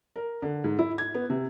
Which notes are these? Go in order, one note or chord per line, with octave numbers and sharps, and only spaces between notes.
A#4
D3
G#2
E4
G#6
B3
C3